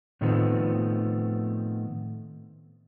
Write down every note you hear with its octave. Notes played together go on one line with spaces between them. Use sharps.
A2 D#3 F3 A3 B3 C4